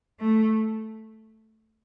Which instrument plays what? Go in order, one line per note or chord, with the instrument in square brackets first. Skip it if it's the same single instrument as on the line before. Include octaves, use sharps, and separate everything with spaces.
[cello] A3